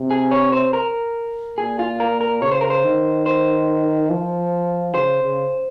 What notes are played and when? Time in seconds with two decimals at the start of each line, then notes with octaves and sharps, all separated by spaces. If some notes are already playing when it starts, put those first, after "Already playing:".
Already playing: C3
0.11 G#4
0.32 C#5
0.52 C5
0.73 A#4
1.58 A#2 G#4
1.79 F4
2.00 A#4
2.21 A#4
2.42 C#3 C#5
2.52 C5
2.61 A#4
2.70 C5
2.84 D#3
3.26 C5
4.10 F3
4.94 C#3 C5
5.22 C#3